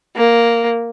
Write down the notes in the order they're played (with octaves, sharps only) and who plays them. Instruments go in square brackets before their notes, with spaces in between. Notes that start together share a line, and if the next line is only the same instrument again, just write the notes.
[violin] A#3